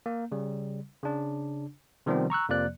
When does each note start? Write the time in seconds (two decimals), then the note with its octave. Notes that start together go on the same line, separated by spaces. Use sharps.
0.06 A#3
0.32 C#3 G3
1.03 C#3 D4
2.06 C3 D#3 F3 G3 B3 C4
2.30 A#5 C#6 E6 F#6
2.49 F2 C3 F3 A#3 D5 F#6